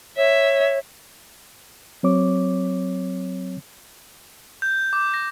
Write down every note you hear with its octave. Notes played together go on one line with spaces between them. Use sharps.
C#5 E5
F#3 C4 C#5 D6
G6
D6
A#6